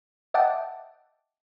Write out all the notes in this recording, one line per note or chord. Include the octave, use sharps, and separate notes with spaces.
D#5 E5 F#5 G5 A5 D6